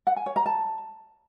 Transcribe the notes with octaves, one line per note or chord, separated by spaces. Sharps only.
F#5
G#5
C#5
A#5
A5